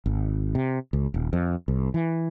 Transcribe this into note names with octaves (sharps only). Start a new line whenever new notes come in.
G#1
C3
C#2
D#1
F2
C2
E3